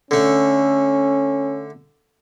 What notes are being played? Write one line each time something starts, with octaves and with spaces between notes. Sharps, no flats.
D3 A3 C#4